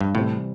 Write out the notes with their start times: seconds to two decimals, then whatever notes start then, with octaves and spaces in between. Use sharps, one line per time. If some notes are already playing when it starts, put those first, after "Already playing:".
0.01 G2
0.14 A2 C3 E3 G3 C4